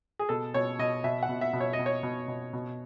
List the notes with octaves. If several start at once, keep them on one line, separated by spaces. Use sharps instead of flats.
G#4
B2 A4
B2 C#5
B2 D#5
B2 E5
F#5
B2
E5
B2
C#5
D#5
B2
C#5
B2
B2
B2